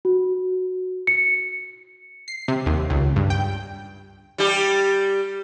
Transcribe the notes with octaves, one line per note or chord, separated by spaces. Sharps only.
F#4
C#7
C7
C3
D#2
C#2
G2
G5
G3 G4